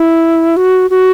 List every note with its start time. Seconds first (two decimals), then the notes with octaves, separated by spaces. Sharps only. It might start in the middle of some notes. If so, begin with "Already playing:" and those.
Already playing: E4
0.57 F#4
0.90 F#4